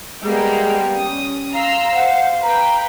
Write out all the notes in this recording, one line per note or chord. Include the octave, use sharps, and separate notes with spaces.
G3 G#3 A#3 B3 G4
C#4 D#6
F5 A#5 C6 E6
C5 F#5
B4 G5 A#5